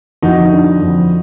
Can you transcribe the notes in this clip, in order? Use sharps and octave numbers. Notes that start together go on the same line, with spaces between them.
F2 D#4 F#4
D3
F2